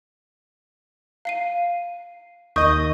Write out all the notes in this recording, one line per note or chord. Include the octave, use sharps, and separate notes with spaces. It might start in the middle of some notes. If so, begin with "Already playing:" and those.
F5 C7 D#7
D#2 D#5 C#6 D#6 G6